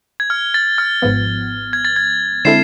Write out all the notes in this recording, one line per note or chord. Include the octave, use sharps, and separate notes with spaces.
G#6
F6
A6
F6
G#1 G#2 F3 B3
G#6
A6
G#6
D3 G#3 C4 E4 A4 C7 E7